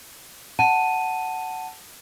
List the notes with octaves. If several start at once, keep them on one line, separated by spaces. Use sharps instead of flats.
F#5 A5 D#7